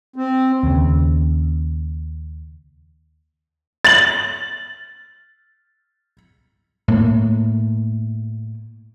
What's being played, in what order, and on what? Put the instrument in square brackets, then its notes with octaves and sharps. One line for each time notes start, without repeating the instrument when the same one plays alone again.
[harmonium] C4
[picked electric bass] D#2 C#3
[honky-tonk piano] A6 F#7
[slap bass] A2 A#3